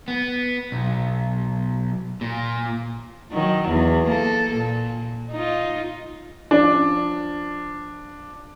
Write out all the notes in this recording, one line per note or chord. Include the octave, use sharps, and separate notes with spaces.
B3
B1
A#2
D#3 F#3
E2
A#3 A4
A#2
D#4 F4
F3 D4